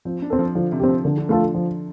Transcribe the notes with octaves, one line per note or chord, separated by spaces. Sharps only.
F3 C4
D4
C4 A4
F3
D3 F3
C3
C4 G4
F3
D3 F3
D3
F3 A3 F4 A4
F3